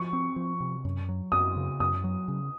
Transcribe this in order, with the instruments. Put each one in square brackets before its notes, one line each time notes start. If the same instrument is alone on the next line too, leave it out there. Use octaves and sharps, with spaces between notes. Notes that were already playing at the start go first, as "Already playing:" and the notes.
Already playing: [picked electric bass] F3 [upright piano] C#6
[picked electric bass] C4
F3
C3
F#2
F#3
[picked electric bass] F#2 [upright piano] D#6
[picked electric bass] C#3
[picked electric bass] F#2 [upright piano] D#6
[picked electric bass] F#3
C#3